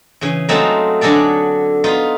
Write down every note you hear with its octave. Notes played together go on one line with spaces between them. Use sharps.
C#3 E3
F#3 G#3 A3 C4 D#4 F4
D3 F#3 G#4 A4 D5
B3 D#4 F4